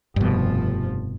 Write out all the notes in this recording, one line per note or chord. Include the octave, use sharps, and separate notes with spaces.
F1 G2 B2 F3